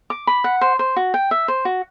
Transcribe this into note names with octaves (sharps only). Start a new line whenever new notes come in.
D6
B5
F#5
C5
C5
F#4
G5
E5
C5
F#4